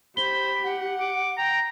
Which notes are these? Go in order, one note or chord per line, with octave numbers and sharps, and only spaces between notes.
G4 C5 B5 G7
F#5
D6
G5 A#5